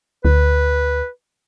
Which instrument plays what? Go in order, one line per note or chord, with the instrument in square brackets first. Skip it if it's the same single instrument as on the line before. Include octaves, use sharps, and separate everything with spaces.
[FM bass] D2 [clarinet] B4